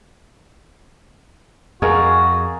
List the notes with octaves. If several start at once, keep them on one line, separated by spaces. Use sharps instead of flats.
F2 F#4 G#4 A#4 F5